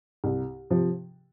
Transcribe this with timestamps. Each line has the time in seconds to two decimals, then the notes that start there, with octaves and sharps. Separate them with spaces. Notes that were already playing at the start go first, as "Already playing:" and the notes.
0.24 C2
0.70 C3 F3